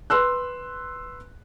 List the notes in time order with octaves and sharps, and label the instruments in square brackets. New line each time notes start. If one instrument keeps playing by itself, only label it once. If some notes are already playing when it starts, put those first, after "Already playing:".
[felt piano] B4 C6 E6 F#6